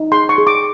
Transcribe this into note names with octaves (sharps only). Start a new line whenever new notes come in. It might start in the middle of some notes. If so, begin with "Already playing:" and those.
Already playing: D#4
G#4 C6
C#6
G#4
D6